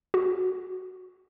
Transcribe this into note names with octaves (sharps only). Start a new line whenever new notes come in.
F#4